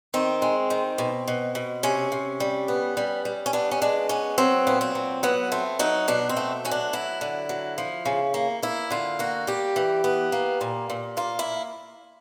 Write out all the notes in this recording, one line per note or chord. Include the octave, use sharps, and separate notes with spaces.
D#3 C4
G#3
D#3
B2
B2
B2
C3 C#4
C3
G3
B3
G3
G3
C#4
B3 D4
C#4
G#3 D4
B3 C#4
F#3 C4
A#2 B3
C4
F#3
F#3 B3
A3 C4
F#3 D#4
B2 D4
C4
A3
F#3 C#4
D4
F#3 E4
D3
F#3
F3
C#3
A#3
A#3 E4
D3 F4
A#3 F#4
G3 G4
E3
B3
A#3
A#2
A#2
A#3 F4
E4